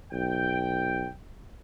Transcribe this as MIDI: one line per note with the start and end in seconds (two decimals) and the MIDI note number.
0.12 1.08 35
0.12 1.09 79